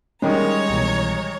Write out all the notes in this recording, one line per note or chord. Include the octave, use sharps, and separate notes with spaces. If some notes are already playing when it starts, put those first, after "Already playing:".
D#3 G3 G#3 C#4 A#4 C#5 A#5 D#6
C2 B2 E3